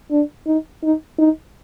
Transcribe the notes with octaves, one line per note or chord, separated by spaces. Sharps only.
D4
D#4
D#4
D#4